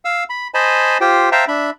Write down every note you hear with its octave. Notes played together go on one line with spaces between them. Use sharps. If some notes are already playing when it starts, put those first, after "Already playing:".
F5 E6
B5
C5 D#5 G#5 A5 B5
F4 G4 C5 G5
C5 E5 F5 G5 A5 A#5
D4 E5 B5